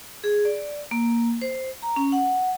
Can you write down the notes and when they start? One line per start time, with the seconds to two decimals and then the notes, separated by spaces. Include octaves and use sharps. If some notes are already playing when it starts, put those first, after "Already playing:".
0.24 G#4
0.45 D5
0.91 A#3
1.41 C5
1.82 A#5
1.96 C#4
2.12 F#5